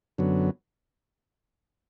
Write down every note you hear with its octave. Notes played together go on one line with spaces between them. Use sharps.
F#2 D3 F#3 B3